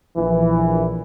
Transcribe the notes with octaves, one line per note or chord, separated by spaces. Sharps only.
A#1 E3